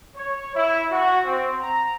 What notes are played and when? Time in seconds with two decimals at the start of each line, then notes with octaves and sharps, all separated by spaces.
0.16 C#5
0.55 E4
0.91 F#4
1.25 C4
1.59 A#5